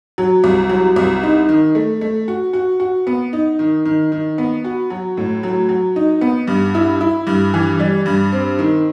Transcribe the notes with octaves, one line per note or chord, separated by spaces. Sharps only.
F#3
C2
F#3
C2
D#4
D#3
A3
A3
F#4
F#4
F#4
B3
D#4
D#3
D#3
D#3
B3
F#4
F#3
A2
F#3
F#3
D#4
B3
G2
E4
E4
G2
E3
G3
G2
C4
D#3